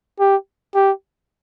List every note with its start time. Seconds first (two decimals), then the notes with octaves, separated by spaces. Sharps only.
0.20 G4
0.75 G4